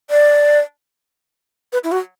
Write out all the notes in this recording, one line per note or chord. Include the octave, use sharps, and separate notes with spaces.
D5
B4
E4
F#4